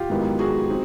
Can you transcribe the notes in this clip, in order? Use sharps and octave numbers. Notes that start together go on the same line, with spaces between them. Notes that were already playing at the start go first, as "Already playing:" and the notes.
Already playing: F4 G4
G#2 D#3 F#3 B3 E4
F#4 G#4
C4 D#4